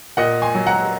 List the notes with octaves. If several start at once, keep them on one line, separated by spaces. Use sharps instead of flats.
A#2 D#5 F#5
G#5 C6
F#3
F#5 A#5